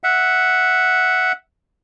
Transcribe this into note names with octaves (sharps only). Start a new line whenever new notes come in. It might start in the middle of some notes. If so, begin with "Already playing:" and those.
E5 F#5